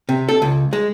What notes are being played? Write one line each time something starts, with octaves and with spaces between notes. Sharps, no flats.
C3
A4
C#2
G#3